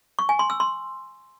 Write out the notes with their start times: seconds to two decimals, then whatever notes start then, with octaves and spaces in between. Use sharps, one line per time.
0.19 C#6
0.29 G#5
0.39 C6
0.50 E6
0.60 C6